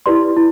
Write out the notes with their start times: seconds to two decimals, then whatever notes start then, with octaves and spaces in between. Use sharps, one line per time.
0.06 E4 G4 B4 D5 C6
0.37 E4